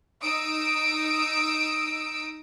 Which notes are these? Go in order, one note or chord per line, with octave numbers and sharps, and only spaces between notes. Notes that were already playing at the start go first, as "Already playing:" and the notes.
D#4 D#6 E6 D7